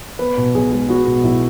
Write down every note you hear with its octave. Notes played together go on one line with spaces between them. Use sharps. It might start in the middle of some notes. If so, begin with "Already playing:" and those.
B3 B4
B2
B1 G#4
G#3
B3 F#4
B2
B1 E4